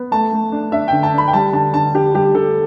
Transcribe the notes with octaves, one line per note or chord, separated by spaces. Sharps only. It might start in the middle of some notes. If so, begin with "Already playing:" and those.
Already playing: B3
A3 A5
A3
D4
D4 E5
D3 G5
A5
D4 B5
G5
G3 A5
D3 A5
D3 A5
D3 G4
G3 G4
D3 A4